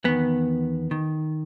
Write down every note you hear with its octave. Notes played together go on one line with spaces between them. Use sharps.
E2 D#3 B3
D#3